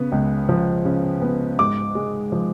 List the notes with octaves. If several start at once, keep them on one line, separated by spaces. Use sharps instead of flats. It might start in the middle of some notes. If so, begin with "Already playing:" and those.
Already playing: C#3 B3
C#2
F3
C#3
B3
G#2 D6
G#3
F3